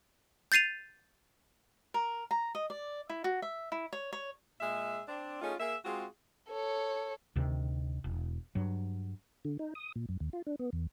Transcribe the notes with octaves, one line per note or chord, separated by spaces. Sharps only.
G6 A6 C7 D#7 F7
A#4
A#5
D#5
D5
E4
F#4
E5
E4
C#5
C#5
A#2 G#3 G#4 E5
C4 D4
A3 C#4 D#4 F4 G#4
A#3 G#4 E5
G#3 C4 F4 F#4 G#4
A4 C#5
D2 C3 D#3
E1
G2 F#3
D3
D#4
D#6
A#2
F#2
D#2
F4
D4
B3
E2